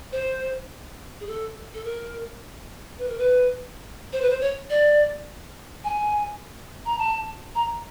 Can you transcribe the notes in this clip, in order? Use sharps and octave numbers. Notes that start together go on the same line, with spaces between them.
C5
G#4
A4
A4
A#4
B4
A#4
B4
C5
B4
C5
C#5
D5
G#5
A#5
A5
A#5